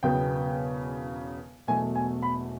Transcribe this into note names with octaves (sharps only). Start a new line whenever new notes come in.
E1 E2 C#3 F#3 B3 G5
E1 E2 B2 F#3 A3 G#5
G#5
B5